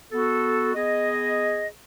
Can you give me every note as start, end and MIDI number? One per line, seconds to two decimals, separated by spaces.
0.12 0.73 59
0.12 0.73 66
0.12 0.73 69
0.74 1.67 59
0.74 1.67 68
0.74 1.67 75